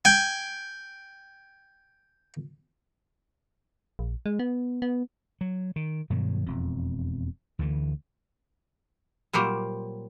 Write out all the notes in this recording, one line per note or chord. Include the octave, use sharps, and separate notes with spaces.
G5 G#5
A#1
G#3
B3
B3
F#3
D#3
G2 B2 D#3 F#3
E1 F2
D2 D3 E3
A#2 F#3 G3 A#3 C5